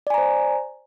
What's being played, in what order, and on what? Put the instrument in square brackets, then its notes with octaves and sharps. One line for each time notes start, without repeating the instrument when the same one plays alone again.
[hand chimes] D5
G#5
A#5
C5